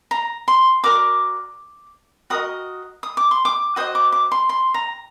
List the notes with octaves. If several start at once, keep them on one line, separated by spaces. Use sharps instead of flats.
A#5
C6
F#4 A#4 D5 D6
F#4 A#4 D#5 D#6
D#6
D6
C6
D6
F#4 C5 D#5 D#6
D6
D6
C6
C6
A#5